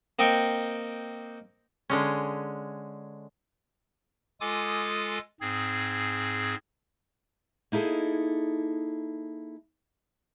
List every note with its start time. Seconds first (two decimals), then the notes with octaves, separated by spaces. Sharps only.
0.19 A#3 C4 D#5 G5 C#6
1.90 D3 G#3 C#4
4.40 G#3 F4 A4 G#5 D6 D#6
5.41 G#2 C4 G#4 G#6
7.72 A#3 D#4 E4 G#4 A4